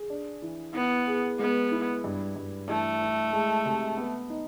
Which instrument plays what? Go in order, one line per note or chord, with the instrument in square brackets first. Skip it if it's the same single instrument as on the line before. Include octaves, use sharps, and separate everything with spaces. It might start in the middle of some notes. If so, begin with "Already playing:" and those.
Already playing: [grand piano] G#4
D4
E3
[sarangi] B3 [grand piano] E4
[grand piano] G#4
[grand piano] G#3 [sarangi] B3
[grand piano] E4
G2
G2
[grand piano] E3 [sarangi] A3
[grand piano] E3
G#3
C3
B3
D#4